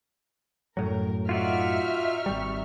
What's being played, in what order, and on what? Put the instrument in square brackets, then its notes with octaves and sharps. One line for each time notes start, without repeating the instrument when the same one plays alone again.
[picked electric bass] F#2 A2 F#3 [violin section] A#4
[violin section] D#4 E5 F6 [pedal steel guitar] F4 F#4 D5
[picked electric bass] G#1 G3 [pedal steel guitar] C#6